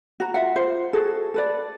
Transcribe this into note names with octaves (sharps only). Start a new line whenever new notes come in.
F#4 A#5
F4 E5 F#5
F4 C5
F#4 G#4 A4
A4 B4 D5